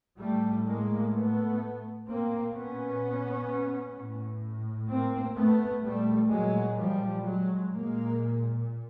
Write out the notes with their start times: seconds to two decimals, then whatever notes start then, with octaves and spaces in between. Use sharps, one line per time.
0.19 A2 G3 A3
0.66 G#3 A#3
1.13 A3 B3
2.08 A#2 A#3 C4
2.54 B3 C#4
3.96 A2
4.89 A#3 C4
5.36 A3 B3
5.83 A#2 G3 A3
6.30 F#3 G#3
6.77 F3 G3
7.24 F#3 G#3
7.71 A#2 G#3 A#3